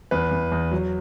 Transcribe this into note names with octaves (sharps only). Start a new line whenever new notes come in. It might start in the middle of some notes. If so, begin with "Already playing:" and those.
E2 B4
E2
E2
F#3